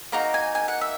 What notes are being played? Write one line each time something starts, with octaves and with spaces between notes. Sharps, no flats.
A#3 D#4 F#4 A#5
G#5
G#5
F#5
E5